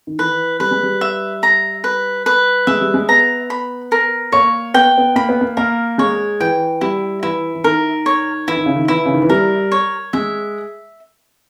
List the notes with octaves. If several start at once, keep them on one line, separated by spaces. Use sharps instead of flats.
D#3
E3 B4
G3 B4
G#3
G3
E5
A#5
B4
B4
G#3 E5
G3
G#3
B3 A#5
B5
A#4
A#3 C#5
B3 G5
B3
A#3 B5
B3
A#3
A#3 A#4
G#3 C#5
E3 G5
G3 E4
E3 E4
E3
D#3 A#4
C#5
E3 E4
D#3
C#3
D#3
E3 E4
C#3
D#3
E3
G3 A#4
C#5
G#3 E5